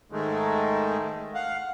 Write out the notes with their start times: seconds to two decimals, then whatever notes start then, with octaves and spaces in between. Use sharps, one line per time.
0.12 G#2 D#3 G#3 A3
1.34 F5 F#5